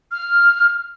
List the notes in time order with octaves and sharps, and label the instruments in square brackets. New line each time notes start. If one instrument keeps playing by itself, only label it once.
[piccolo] F6